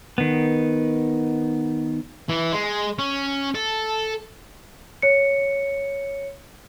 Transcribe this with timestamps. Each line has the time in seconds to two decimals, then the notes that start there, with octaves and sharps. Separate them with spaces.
0.18 D#3 B3
2.29 E3
2.52 G#3
2.99 C#4
3.55 A4
5.02 C#5 C#7